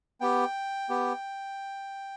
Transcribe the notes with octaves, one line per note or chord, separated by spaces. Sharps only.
B3 G4 G5
B3 G4